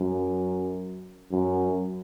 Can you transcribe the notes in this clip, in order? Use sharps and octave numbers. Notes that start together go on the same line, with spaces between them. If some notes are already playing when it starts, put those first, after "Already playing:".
Already playing: F#2
F#2